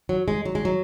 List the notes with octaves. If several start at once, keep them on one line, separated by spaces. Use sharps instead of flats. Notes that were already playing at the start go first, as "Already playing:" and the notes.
F#3
G#3
F#3
G#3
F#3